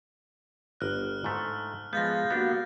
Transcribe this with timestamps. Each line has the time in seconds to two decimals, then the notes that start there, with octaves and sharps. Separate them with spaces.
0.81 G1 D#5 F6 F#6
1.24 G#2 A3
1.93 F3 G#3 B3 F5 G6 A6 A#6
2.30 G3 A#3 B3 D4 F#4